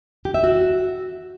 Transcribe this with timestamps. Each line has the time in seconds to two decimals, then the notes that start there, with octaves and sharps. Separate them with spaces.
0.25 G4
0.34 E5
0.44 F#4